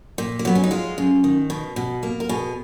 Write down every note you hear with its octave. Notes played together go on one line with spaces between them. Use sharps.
A#2
A#3
F#3 B3
C#4
D#4
G#3 F4
F#2
D#3
B2
B2
A#3
A#4
B2 G#4